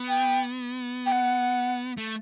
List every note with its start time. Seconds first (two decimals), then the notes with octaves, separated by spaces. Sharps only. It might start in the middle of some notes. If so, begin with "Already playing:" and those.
Already playing: B3
0.09 G5
1.06 G5
1.12 F#5
1.97 A3